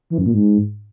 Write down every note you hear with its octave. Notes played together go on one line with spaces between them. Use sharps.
E3
F#2
A#2
G#2